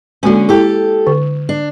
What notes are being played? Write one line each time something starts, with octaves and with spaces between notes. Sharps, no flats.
D3 G#3 A#3 C#4 F#4
E4 G4 A4
D3
D4